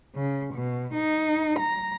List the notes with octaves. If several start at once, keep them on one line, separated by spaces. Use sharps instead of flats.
C#3
B2
D#4
A#5